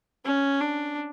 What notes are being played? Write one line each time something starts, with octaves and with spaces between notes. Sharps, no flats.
C#4
D4